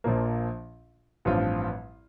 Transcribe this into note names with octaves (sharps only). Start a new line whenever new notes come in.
A#1 A#2 F3 A#3
A1 G2 F3 C4 F4